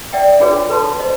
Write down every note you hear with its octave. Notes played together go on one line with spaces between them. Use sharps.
D5 E5 F#5 G5
D4 F4 F#4 G#4 B4 C#5
A4 B4 A5 C6
C5 D#5